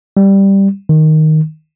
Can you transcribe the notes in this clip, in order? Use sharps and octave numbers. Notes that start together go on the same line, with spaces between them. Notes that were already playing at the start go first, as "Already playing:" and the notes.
G3
D#3